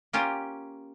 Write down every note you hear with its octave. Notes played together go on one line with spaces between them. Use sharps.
A#3 C#4 F4 G4